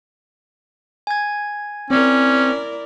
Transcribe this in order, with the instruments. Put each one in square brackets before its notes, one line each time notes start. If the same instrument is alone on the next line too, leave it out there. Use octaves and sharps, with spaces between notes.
[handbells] G#5 G#6
[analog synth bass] C4 [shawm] C#4 [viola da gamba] E4 A#4 D5